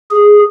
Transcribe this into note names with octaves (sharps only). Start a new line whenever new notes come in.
G#4